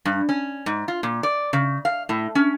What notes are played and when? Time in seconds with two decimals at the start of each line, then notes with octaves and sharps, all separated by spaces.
0.05 G2
0.29 C#4
0.66 G#2
0.88 F4
1.03 A#2
1.23 D5
1.53 C#3
1.85 F5
2.09 A2
2.35 C#4